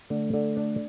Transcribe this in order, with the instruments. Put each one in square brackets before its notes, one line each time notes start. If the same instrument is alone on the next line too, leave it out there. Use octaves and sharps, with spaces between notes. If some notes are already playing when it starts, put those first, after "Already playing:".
[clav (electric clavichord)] D3 [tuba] A3
[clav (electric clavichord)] D3
D4